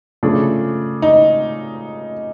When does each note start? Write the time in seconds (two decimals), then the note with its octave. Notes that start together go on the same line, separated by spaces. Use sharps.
0.23 C#3 F3 A3 D4
1.02 D#4